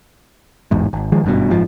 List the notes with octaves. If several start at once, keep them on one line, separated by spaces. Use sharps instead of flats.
A1 E2 G#2
G#1
D#3 F3 G#3
G#1 G2 B2
F#1 G#2 F3